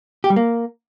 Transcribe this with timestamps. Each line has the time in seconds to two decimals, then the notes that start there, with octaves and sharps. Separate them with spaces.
0.24 G4
0.30 G3
0.36 A#3